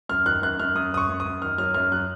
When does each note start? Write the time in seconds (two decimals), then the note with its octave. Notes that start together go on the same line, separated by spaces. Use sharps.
0.09 F#2 F6
0.26 D#3 F#6
0.42 F#2 F#6
0.60 F#2 F6
0.75 F#2 D#6
0.92 F#2 D#6
0.97 C#6
1.09 F#2
1.20 D#6
1.25 F#2
1.41 D#3 F6
1.58 F#3 F6
1.74 F#2 F6
1.92 F#3 F#6